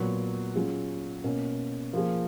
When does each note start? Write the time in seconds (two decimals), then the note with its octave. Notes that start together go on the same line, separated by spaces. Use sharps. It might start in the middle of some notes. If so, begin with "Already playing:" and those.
Already playing: A#2 F#3 B3 F#4
0.56 F#3 C#4 F4 G#4
1.24 B2 A#3 C#4
1.93 F3 A#3 F4 G#4